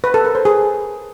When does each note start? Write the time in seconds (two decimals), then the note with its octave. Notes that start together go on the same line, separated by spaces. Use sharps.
0.04 B4
0.14 A4
0.25 A#4
0.35 C5
0.45 G#4